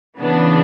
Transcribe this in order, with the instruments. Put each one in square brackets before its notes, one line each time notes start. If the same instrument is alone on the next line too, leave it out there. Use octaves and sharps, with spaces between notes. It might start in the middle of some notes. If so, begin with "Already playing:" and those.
[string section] C#3 E3 B3 D4